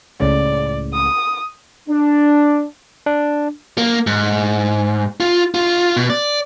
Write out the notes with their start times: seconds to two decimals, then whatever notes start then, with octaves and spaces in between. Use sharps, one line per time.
0.20 C#2 A2 C#3 D5
0.94 D#6
1.89 D4
3.06 D4
3.78 A#3
4.07 G#2
5.20 F4
5.54 F4
5.97 B2
6.10 D5